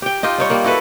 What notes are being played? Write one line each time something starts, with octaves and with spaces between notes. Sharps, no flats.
G4 G5
D#4 F4 G4 D#5
G3 D#4 C#5
G3 A#3
E4 F#4 A4 B4